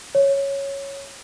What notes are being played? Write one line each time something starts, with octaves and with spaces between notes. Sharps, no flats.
C#5